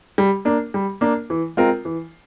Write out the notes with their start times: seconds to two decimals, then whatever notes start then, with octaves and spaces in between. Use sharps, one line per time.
0.18 G3
0.45 A#3 D4
0.74 G3
1.01 A#3 D4
1.30 E3
1.57 G#3 C4 F4 A#4
1.85 E3